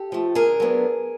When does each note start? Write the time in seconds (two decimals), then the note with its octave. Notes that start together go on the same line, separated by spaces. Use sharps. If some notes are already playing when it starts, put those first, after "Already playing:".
Already playing: G4 A4
0.12 F3 A3
0.35 D3 G#4 A#4
0.60 F#3 B3 D4